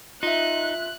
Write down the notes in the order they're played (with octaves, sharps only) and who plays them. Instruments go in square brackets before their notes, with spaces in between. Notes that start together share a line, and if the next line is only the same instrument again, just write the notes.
[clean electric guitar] D#4 [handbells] F4 E5 [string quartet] F#6